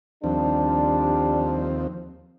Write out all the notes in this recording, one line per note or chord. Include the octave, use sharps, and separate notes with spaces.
D#2 F3 G3 C4 D4